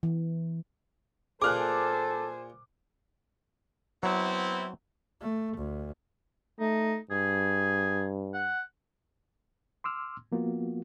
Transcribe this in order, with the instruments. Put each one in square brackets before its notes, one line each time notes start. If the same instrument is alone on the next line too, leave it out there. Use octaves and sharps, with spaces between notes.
[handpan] E3
[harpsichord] A#2 G#4 [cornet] A4 [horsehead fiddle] C5 G#5 [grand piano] D6 F6 F#6
[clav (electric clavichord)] F#3 [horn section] B3 C4 E4
[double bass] A3
D2
[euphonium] A3 [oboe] D#4
[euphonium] G2 [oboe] G#4
[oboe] F#5
[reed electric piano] C6 D6 E6 F6
F3 A#3 B3 F4 F#4